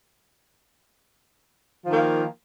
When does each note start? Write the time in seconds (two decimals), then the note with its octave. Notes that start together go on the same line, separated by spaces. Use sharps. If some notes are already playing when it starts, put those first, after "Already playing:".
1.84 F3
1.88 D#3
1.93 A#3